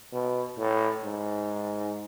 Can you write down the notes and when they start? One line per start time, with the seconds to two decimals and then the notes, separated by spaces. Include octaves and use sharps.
0.12 B2
0.58 A2
1.04 G#2